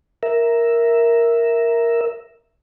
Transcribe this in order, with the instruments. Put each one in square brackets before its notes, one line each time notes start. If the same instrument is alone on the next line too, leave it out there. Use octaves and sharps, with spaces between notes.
[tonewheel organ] A#4 E5